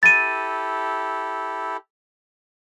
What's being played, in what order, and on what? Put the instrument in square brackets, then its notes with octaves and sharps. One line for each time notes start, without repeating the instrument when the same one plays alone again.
[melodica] E4 G4 A4 [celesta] A6 D#7